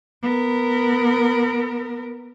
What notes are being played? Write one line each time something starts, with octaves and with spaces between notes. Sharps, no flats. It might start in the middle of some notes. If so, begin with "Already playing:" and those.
B3 A#4